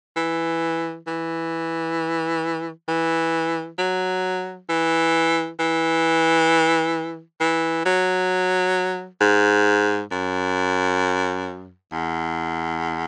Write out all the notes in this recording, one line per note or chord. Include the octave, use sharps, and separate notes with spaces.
E3
E3
E3
F#3
E3
E3
E3
F#3
G#2
F#2
E2